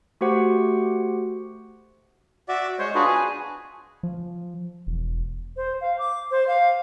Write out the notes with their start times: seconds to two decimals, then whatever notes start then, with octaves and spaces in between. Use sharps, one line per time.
0.21 A3 F#4 G4 C5 F#5
2.49 F#4 D5 E5
2.79 G#3 C5 C#5
2.95 D4 F4 F#4 G#4 B4
3.07 G#5
4.03 F3
4.87 E1
5.57 C5
5.81 F5
5.99 D6
6.31 C5
6.47 F5